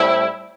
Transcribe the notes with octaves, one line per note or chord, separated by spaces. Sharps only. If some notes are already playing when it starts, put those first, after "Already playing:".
Already playing: A2 G3 C4 E4